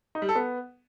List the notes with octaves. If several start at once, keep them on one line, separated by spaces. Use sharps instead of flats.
D#4
G3
A4
B3